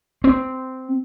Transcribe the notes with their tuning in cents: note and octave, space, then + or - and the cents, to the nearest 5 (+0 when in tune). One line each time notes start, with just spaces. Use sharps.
C4 -10